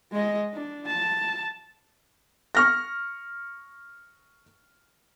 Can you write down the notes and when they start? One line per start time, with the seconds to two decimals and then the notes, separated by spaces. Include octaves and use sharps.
0.12 G#3 D#5
0.53 D4
0.87 A5
2.55 C#6 F6 A#6